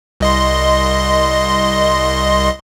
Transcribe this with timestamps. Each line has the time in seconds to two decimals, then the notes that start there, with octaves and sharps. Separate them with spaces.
0.20 C2 D#5 C6